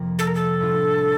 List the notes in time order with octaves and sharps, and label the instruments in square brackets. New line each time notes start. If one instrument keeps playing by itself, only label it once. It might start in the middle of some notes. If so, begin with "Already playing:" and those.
Already playing: [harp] F2 C3 F3 A#3
[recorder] A4
A#4
A4
[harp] A2 G3 D4 F4